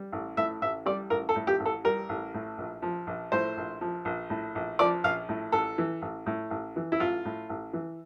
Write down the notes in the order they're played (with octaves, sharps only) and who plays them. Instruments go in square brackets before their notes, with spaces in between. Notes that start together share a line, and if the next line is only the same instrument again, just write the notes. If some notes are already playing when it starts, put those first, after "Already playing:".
Already playing: [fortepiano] G3
A1
A2 E5
A1 E5
G3 D5
A1 A#4
A4
A2
G4
A1
A4
G3 A#4
A1
A2
A#1
F3
A#1
A2 C5
A#1
F3
A#1
A2
A#1
F3 D5
A#1 F5
A2
A1 A4
E3
A1
A2
A1
E3
E4
A1 F4
A2
A1
E3